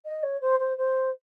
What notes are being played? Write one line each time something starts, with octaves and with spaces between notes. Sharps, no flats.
D#5
C#5
C5
C5
C5